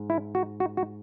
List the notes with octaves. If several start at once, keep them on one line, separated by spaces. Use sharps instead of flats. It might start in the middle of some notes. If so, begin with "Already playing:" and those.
Already playing: G#2
E4
F#4
F#4
F#4